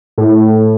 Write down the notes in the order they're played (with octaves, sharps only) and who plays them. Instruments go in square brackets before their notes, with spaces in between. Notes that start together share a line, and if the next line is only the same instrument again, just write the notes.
[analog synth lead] A2